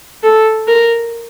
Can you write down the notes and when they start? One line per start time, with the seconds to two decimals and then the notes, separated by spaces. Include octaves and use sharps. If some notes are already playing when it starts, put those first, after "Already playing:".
0.23 A4
0.67 A#4